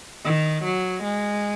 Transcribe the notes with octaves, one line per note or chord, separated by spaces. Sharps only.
D#3
F#3
G#3